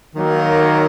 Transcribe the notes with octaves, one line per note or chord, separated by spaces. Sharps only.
D#3 F#3 A#3